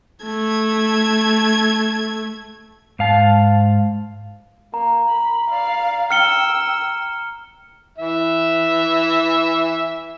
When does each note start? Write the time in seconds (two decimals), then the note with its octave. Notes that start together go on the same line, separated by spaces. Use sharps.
0.25 A3 G#6
2.99 G#2 F5 A5
4.74 A#3 A#5
5.09 B5
5.49 D5 F5
6.11 G5 E6 F6 C#7 G7
7.98 E3 E5